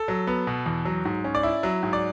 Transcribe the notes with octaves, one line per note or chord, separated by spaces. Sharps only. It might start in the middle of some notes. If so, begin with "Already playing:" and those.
Already playing: A4
F#3
B3
B2
E2
F#3
G#2
C#4
D5
E4
F#3
G#2
D5